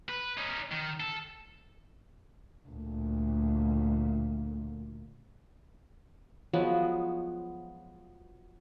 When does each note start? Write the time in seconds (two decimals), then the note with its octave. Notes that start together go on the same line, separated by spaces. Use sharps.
0.09 B4
0.38 C#4 D#4
0.72 D#3
1.00 A4
2.68 D2 A#2
6.53 F3 F#3 G#3 B3